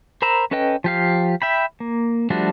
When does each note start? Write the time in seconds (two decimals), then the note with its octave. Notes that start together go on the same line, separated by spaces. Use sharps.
0.22 A#4 C5 A#5 B5 E6
0.51 C#4 A4 B4 D#5 G5
0.84 F3 G4 F5
1.42 E5 G5 B5
1.80 A#3
2.30 F3 G3 A3 D4 F#4